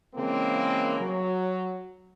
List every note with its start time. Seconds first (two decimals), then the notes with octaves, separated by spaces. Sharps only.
0.15 C#3 E3 G#3 A#3 C4
0.99 F#3